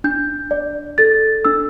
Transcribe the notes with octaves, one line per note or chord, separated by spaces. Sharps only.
D4 G6
D5
A4 A6
D4 E6